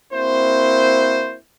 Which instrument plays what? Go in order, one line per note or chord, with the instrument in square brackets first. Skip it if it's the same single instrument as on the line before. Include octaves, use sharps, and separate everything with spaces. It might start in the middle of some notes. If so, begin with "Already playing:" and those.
[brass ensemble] A#3 C4 E4 F#4 C5